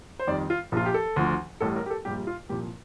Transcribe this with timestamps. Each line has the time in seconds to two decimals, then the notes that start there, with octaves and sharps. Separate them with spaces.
0.19 C5
0.27 F2 D#3 G3 D5
0.50 F4
0.72 A#1 A#2 F3 F4
0.86 G4
0.94 A4
1.16 D2 D3 F3
1.60 A1 A2 G3 A4
1.76 A#4
1.86 G4
1.90 A4
2.05 A#1 A#2 G3 G4
2.27 F4
2.49 C2 A#2 F3 G4